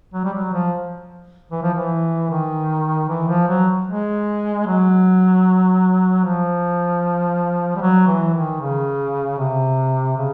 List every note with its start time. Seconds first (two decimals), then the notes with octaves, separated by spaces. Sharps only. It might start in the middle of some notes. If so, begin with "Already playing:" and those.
0.14 F#3
0.24 G3
0.33 F#3
0.53 F3
1.51 E3
1.63 F3
1.74 E3
2.30 D#3
3.09 E3
3.29 F3
3.48 F#3
3.87 G#3
4.67 F#3
6.24 F3
7.76 G3
7.81 F#3
8.07 E3
8.34 D#3
8.60 C#3
9.38 C3
10.17 C#3